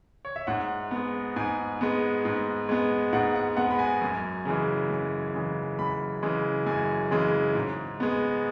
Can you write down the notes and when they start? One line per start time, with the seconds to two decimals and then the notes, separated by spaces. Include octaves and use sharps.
0.25 C#5
0.36 E5
0.47 G#2 F#5
0.91 G#3 B3
1.36 G#2 G#5
1.81 G#3 B3
2.25 G#2
2.69 G#3 B3
3.13 G#2 F#5
3.35 F#5
3.57 G#3 B3 F#5
3.71 B5
3.79 G#5
4.02 F#2
4.45 C#3 E3 G#3
4.90 F#2
5.34 C#3 E3 G#3
5.79 F#2 B5
6.23 C#3 E3 G#3
6.66 F#2 G#5
7.11 C#3 E3 G#3
7.55 G#2
8.00 G#3 B3